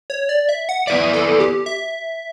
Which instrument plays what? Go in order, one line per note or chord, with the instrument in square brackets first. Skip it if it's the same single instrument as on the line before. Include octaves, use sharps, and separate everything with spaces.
[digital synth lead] C#5
D5
E5
F#5
[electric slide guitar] B3 E4 B4 D5 [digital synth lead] E5
[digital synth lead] A4
G4
E5